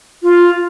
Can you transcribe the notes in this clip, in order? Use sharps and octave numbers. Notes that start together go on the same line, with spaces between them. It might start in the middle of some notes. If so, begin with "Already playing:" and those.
F4